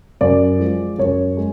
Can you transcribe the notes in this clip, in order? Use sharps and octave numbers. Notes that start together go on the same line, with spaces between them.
F#2 D5
F3 G#3
F#2 C#5
G#3